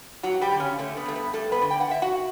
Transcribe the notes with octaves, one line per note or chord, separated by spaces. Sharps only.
G2 F#3 F#4
G3 G4
D3
C#3 C#4
D3 A3
B3
G2 A3
B3
G2 A3 A4
B3 B4
D3
G5
F#5
D3 E5
F#4 F#5